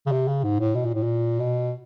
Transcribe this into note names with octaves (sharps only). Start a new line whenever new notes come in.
C#3
C3
C#3
G#2
A2
B2
A#2
A2
A#2
B2